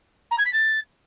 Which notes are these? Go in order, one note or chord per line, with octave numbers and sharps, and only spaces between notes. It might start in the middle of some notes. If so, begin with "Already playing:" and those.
A#5
G#6
B6
A6